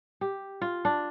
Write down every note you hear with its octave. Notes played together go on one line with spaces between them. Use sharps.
G4
F4
D4